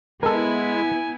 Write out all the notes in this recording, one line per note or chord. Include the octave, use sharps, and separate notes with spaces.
G#3 B3 E4 A4 A#4 G#5